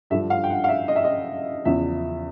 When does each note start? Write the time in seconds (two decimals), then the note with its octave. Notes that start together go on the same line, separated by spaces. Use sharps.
0.10 G2 D3 F3 E5
0.30 F5
0.44 G5
0.50 F#5
0.64 F5
0.69 E5
0.88 D#5
0.96 E5
1.04 D#5
1.65 E2 C#3 F3 E5